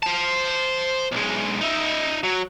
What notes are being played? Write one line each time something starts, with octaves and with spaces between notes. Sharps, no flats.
C5 A5
B1 G#3
D#4 E5
F#3